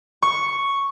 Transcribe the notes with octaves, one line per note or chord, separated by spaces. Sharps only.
C#6